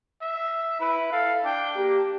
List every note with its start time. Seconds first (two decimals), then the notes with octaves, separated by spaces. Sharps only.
0.21 E5
0.80 E4 B4
1.12 A4 F5
1.45 D4 G5
1.77 A#3 G4